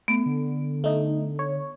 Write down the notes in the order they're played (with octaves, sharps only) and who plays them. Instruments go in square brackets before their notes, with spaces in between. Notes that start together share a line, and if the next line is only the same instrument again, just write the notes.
[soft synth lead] A3 [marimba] B3
[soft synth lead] D3
[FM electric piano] A3 D#4
C#5